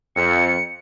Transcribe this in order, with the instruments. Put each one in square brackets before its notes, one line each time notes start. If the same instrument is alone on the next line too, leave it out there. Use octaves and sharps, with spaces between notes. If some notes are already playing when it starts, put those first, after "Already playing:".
[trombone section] F2 [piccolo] C#7